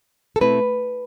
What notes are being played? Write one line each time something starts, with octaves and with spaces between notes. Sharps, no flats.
A4
B2 A3 C4 E4 B4